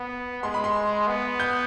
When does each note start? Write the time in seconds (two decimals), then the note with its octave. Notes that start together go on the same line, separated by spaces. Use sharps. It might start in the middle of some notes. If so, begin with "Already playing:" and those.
Already playing: B3
0.43 G#3 C6
0.54 B5
0.64 C6
1.08 B3
1.40 G6